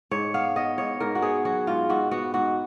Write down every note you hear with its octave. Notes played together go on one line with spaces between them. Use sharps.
G#2 C#5
B3 F5
B3 D#5
G#2 C#5
G#2 A#4
F#4
B3 G#4
F#3 F#4
G#2 F4
G#2 F#4
B3 F#4
G#2 F#4